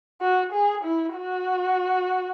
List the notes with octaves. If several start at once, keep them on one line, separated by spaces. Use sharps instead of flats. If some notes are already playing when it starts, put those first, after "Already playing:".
F#4
G#4
E4
F#4